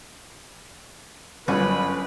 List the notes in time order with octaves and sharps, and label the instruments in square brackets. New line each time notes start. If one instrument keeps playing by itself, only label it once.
[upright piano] G1 F#2 [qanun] C#4 [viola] B4